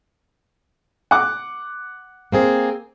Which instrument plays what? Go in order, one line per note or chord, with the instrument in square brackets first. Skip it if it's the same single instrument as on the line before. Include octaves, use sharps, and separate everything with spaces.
[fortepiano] F#5 D6
[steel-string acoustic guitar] A#3 C4 G#4